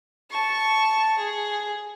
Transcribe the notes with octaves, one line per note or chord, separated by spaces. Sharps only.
A5 C#6
G#4